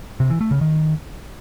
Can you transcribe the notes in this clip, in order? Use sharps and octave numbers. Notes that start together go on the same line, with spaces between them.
C3
E3
A3
C#3
D#3